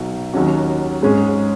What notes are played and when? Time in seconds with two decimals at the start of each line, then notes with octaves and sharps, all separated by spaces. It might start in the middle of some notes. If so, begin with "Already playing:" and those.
Already playing: B1 B2 F#3 D#4
0.33 D#2 D#3 F#3 C#4 F#4
1.02 G#2 G#3 C#4 G#4